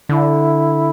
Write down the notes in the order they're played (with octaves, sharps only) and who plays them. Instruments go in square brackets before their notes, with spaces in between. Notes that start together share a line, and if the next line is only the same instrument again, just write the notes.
[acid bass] D3 [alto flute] E4